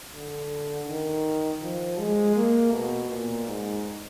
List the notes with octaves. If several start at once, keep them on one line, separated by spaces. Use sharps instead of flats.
D3
D#3
F3
G#3
A#3
B2
A#2
G#2